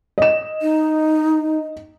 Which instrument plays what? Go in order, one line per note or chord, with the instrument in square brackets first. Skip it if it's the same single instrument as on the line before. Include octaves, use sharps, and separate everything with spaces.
[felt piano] D#5 E7
[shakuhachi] D#4